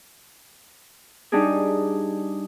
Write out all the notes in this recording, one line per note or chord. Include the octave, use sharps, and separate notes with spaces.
G3 D4 D#4 G4 G#4